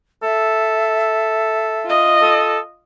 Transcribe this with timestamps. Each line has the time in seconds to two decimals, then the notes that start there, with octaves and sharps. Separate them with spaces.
0.23 A4 E5
1.86 F4 D#5
2.21 A4